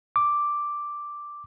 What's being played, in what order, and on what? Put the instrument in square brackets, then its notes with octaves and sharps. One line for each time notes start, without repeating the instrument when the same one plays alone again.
[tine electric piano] D6